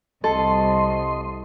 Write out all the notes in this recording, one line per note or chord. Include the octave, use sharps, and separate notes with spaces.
C2 A4 D#5 C6